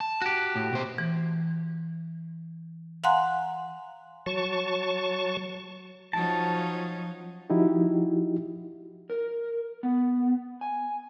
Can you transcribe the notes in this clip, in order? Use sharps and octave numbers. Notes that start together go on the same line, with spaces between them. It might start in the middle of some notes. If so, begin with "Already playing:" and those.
A5
F#4 G4
A2
B2 C5
E3
F5 F#5 G#5 A#5 C6 F#6
F#3 A5 C#6
F3 F#3 C#4 D#4 A5
F3 D#4 E4 F#4 G4
A#4
B3
G#5